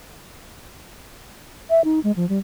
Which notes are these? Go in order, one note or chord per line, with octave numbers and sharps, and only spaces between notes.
E5
D#4
G#3
F3
G3